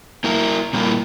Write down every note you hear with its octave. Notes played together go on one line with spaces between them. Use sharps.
A#3 E4 A#4
A#2 G3 A#3 E4